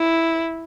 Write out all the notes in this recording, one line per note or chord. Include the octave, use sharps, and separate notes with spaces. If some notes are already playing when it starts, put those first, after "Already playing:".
Already playing: E4